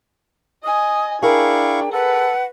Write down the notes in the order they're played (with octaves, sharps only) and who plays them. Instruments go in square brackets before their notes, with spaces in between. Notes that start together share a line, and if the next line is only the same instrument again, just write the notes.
[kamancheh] D#5 G#5 [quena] D#6
[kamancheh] D4 [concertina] E4 F5 C#6 [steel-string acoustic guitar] G#4 A#4 [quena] G5
[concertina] A4 [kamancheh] B4 [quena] F#5